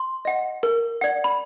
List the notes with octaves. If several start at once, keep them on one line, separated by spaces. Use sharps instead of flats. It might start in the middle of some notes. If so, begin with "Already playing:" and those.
Already playing: C6
D#5 F#5
A#4
D5 F#5
B5